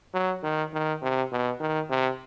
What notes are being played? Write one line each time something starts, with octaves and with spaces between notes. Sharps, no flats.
F#3
D#3
D#3
C3
B2
D#3
C3